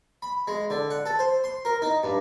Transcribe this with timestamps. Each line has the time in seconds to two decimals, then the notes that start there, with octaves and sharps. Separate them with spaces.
0.22 B5
0.48 G#3
0.70 D3
0.91 F#5
1.06 A4
1.19 C5
1.44 C6
1.65 A#4
1.82 D#4
2.03 G2